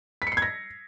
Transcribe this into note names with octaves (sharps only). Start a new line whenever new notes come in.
B6
C#7
C7
G#6
A#6